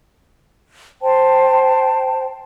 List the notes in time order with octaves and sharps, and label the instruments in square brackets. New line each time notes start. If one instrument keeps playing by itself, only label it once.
[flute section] C5 G5 A5